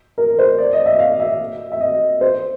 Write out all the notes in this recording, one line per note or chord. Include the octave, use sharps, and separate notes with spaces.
A#4
C5
D5
D#5
E5
F5
E5
E5
D#5
C5